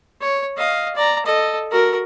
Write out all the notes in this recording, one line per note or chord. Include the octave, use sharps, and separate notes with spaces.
C#5
D#5 F5
D5 A#5
A4 D#5
F#4 A#4